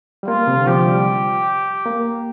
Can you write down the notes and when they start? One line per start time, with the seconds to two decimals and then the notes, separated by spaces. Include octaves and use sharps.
0.23 G3
0.28 A#3 F4
0.47 C3
0.57 D3
0.67 F3 G4
0.87 G3
1.86 A#3